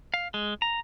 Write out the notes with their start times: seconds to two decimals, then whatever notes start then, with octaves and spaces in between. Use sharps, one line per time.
0.14 F5
0.34 G#3
0.62 A#5